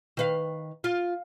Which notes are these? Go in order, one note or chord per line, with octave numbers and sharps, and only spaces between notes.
D#3 B4 F5
F4